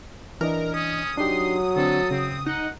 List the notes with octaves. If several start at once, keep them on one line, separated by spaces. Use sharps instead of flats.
E3 D4 A#4 D#5
C#4 D#6
F#3 D4 D#4 G4 C6
D3 C4 D4 A4
C#3 C4
D#4 F#5